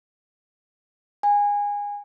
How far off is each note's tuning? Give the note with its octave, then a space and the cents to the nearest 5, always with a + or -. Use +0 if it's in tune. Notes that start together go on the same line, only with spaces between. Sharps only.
G#5 -20